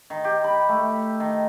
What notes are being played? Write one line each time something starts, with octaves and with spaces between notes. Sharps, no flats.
D#3
G4
B5
A3
D#3